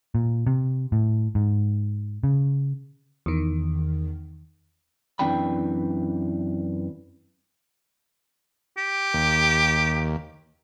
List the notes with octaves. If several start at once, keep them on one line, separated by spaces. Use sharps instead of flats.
A#2
C3
A2
G#2
C#3
E2 D#3
F#2 E3 C4 D4 G5 B5
G4
D#2